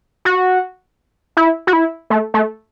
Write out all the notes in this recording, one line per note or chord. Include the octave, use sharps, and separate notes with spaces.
F#4
E4
F#4
E4
A3
A3